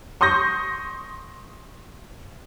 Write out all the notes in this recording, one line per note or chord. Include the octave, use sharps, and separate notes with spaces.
C6 C#6 D#6 G6 A#6